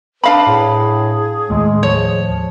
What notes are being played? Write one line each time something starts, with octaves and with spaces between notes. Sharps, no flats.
D4 B4 F5 B5
A2 G#4
D#2 A2 G#3
F3 C#5